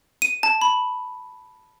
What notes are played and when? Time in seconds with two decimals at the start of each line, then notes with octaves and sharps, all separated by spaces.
0.22 D#7
0.43 A5
0.61 B5